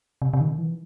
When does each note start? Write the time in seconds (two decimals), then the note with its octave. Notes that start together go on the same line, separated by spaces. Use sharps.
0.22 C3
0.33 C3
0.40 D#3
0.58 E3